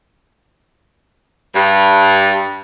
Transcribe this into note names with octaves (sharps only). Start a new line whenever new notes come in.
G2